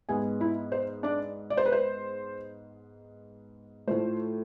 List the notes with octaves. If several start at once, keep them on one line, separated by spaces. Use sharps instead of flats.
G#2 G#3 B3 G#4 G#5
E4 E5
C5
D4 D5
D5
C5
B4
C5
A2 F3 A3 C5